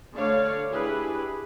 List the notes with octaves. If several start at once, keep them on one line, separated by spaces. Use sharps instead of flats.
D3 A3 C#5 D5 F5
D4 E4 G4 G#4 B4